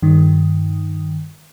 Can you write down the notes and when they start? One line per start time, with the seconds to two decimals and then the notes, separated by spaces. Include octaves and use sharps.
0.02 G2 D#3